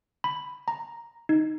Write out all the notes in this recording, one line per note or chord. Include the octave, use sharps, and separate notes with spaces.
B5
A#5
D#4